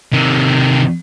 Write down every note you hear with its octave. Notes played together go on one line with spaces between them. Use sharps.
C3 D#3